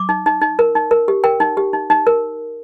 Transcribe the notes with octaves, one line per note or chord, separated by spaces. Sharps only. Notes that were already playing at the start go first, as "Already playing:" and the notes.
Already playing: D6
D#4
D#4
D#4
A#4
D#4
A#4
G4
A#4 G5
D#4
G4
D#4
D#4
A#4